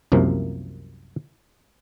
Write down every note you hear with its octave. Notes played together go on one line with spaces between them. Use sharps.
C2 F#2 C3 F3 A#3